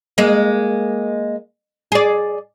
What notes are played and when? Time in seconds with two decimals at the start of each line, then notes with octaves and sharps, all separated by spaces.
0.18 G#3 A#3
1.92 G#4 D5